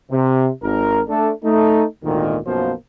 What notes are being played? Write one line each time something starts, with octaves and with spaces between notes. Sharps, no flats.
C3
G#1 A#4
A3 D4 A4
A3 D#4
G#1 D2 A#2 D#3
B1 F#2 B2 F3 A#3 C5